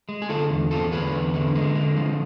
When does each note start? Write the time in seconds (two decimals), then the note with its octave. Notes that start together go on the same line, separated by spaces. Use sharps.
0.09 G#3
0.22 G#4
0.29 D3 F4 A4
0.51 E2
0.71 E2 F4 A4
0.92 D3 G#4 B4
1.13 E2
1.34 D3
1.55 G#3
1.75 D3
1.97 F3